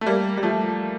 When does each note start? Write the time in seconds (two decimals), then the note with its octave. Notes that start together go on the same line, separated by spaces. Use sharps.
0.01 A3
0.06 G3 A#3
0.38 G3
0.43 F3 A3